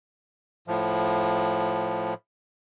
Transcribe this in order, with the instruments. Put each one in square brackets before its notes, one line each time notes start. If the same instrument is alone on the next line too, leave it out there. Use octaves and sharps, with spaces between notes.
[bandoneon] A2 F3